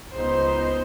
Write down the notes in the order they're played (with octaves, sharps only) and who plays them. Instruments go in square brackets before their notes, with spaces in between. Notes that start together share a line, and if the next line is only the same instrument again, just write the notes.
[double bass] C#2 B3 [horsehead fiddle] D#4 C5